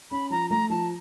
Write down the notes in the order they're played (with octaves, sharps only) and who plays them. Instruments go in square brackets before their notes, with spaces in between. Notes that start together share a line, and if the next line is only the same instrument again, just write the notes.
[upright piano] C#4 [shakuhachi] B5
[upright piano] F3 [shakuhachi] A#5
[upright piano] A3 [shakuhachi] A#5
[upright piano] F3 [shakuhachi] A5